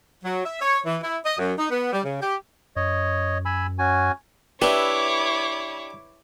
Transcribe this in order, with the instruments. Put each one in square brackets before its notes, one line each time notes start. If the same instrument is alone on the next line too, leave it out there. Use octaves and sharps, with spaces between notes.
[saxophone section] F#3
E5
C#5
E3
E4
D#5
F#2
D#4
B3
G3
C#3
G4
[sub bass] F#2 [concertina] C#5 D#5
[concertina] G#5 B5 E6
C#4 F#4 G#5
[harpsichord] D4 G4 [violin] E4 C#5 [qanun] B4 E5 [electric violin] D6